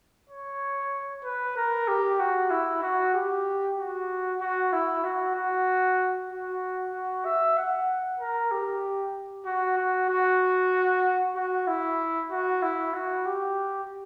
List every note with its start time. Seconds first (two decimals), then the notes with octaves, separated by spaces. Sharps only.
0.30 C#5
1.24 B4
1.56 A#4
1.88 G4
2.19 F#4
2.50 E4
2.82 F#4
3.14 G4
3.77 F#4
4.40 F#4
4.72 E4
5.04 F#4
5.35 F#4
6.30 F#4
6.93 F#4
7.25 E5
7.57 F#5
8.19 A#4
8.51 G4
9.46 F#4
9.77 F#4
10.09 F#4
11.36 F#4
11.67 E4
12.31 F#4
12.62 E4
12.94 F#4
13.25 G4